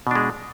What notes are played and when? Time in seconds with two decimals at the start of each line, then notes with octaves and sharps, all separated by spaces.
0.07 B2
0.11 D4
0.16 G#3